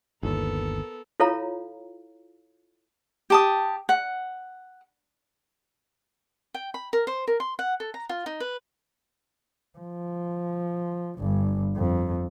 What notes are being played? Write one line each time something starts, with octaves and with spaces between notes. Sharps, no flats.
G1 D#2 B3 A4 A#4
E4 F4 A4 C#5 F5 A#5
G4 A5 D#6
F#5
G5
B5
A#4
C5
A#4
C6
F#5
A4
A#5
F4
D#4
B4
F3
G1 G2
F2